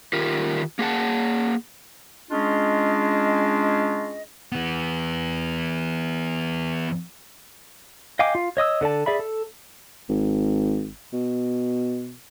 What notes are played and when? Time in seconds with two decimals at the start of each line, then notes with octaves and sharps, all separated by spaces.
0.13 D#3 F4 G4 A#4
0.79 A#3 G#4 F#5 A5
2.30 G#3 C#4 D4 F4 G#4 D#5
4.52 E3 B3
8.19 D#5 F5 G5 G#5 D6
8.35 F4
8.57 C#5 D#5 D#6 E6
8.81 D3 A4 D5 A5
9.06 G#4 D5 E5 B5
9.19 A4
10.09 G#1
11.13 B2